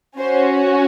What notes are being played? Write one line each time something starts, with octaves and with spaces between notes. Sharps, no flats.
C#4 F#4 C5